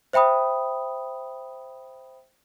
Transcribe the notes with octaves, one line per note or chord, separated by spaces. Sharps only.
C5 E5 G5 B5 D#6